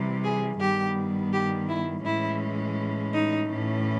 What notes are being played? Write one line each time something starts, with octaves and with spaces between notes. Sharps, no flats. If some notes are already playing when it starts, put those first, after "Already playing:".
Already playing: C3 E3 G3
G#4
G2 D#3 G3 B3 G4
G4
E4
A2 E3 G#3 C#4 E4
D#4
A2 E3 A3 C#4